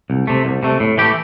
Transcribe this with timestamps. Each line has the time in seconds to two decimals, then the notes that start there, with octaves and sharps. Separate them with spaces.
0.10 C2
0.27 C3 A3
0.45 C2
0.63 C3 A3
0.80 A2
0.98 E3 A3 G4